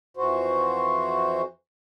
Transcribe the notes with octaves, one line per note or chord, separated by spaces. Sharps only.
F2 E3 F#4 C5